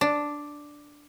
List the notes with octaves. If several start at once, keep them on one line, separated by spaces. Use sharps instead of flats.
D4